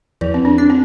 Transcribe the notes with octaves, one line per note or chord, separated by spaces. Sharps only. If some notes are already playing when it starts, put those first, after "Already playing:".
E2 F3
C4
D4
D4
C4